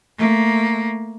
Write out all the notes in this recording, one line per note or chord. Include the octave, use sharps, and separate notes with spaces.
A3 A#3